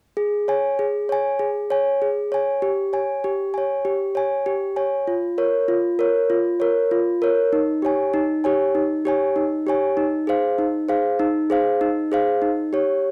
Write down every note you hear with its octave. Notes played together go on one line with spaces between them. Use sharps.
G#4
C#5 G#5
G#4
C#5 G#5
G#4
C#5 G#5
G#4
C#5 G#5
G4
C#5 G#5
G4
C#5 G#5
G4
C#5 G#5
G4
C#5 G#5
F4
A#4 C#5
F4
A#4 C#5
F4
A#4 C#5
F4
A#4 C#5
D#4
G4 C#5 G#5
D#4
G4 C#5 G#5
D#4
G4 C#5 G#5
D#4
G4 C#5 G#5
D#4
G#4 C5 F5
D#4
G#4 C5 F5
D#4
G#4 C5 F5
D#4
G#4 C5 F5
D#4
G4 C#5